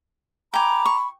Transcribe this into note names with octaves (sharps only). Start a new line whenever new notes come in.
G5 G#5 A#5 B5 D6
C#6